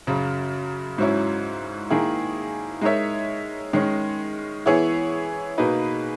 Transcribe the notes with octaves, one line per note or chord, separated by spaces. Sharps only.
F#2 C#3 F#3
G#2 F#3 C#4 E4
D#3 A#3 E4 G#4
G#3 D#4 A#4 C#5 E5
D#3 G#3 C#4
E3 B3 E4 G#4 C#5
B2 A#3 D#4 G#4 B4